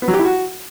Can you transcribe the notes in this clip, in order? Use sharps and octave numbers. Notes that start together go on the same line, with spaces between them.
B3
F#3
G4
E4
F#4